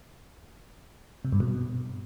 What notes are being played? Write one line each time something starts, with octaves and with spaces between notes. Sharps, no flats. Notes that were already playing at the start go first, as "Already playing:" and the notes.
C3
G2
B2